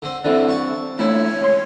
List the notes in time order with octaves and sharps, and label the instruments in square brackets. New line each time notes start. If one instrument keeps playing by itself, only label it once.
[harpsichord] D3 C4
[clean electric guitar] G2 C4 D4 [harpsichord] D3 E3
[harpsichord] A5 C#6
[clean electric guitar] D3 E3 A3 [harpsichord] E4 [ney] C#5
[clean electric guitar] C#2 C6